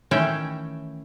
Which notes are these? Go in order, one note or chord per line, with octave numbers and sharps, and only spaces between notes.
D#3 E3 A3 C#4 G5